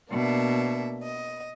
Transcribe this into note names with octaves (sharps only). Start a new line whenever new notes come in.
B2 A#3 D4 E5
D#5